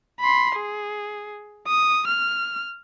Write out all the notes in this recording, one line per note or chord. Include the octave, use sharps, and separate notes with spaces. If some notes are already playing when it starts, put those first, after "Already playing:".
B5 C6
G#4
D#6
F6